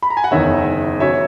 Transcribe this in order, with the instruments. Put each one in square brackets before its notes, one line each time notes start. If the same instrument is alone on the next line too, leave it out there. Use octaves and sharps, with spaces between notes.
[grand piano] B5
A#5
G#5
F#5
[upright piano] F#1 E2 D#3 [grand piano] C#5 E5
[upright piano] C#3 F#3 [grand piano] C#5 E5